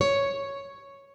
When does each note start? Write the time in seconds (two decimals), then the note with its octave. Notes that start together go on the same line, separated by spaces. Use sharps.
0.01 C#5